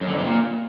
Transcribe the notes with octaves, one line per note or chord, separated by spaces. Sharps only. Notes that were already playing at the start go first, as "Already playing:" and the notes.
F#2
D3
F2
C3
A#2